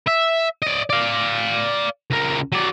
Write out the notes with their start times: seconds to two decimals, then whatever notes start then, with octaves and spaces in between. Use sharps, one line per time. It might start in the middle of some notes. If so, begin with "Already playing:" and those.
0.07 E5
0.62 D5 D#5
0.90 D5 F5
2.10 C#2 A#4
2.52 F#3 D5